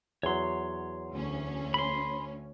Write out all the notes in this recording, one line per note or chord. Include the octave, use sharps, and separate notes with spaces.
E2 F#3 C#5 C6
D2 C#4
B5 C6